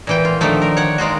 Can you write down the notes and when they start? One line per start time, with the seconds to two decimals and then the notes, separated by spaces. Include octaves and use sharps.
0.07 A#2 E3 G5
0.25 F4
0.41 D3 D#3 F3 A3
0.62 A#4
0.77 C#5 F#5
0.98 D#3 G#3 F4 F#4